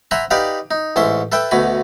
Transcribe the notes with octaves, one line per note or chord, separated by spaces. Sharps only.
C5 E5 F#5 G#5 A#5 B5
D#4 G4 B4 D5 F5 F#5
D#4
A1 G#2 C#4 E5 C6
A4 B4 E5 G5
D2 B2 A3 G#5 B5